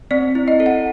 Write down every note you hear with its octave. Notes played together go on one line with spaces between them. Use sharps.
C4 D5
E4
D#5
A4
F#5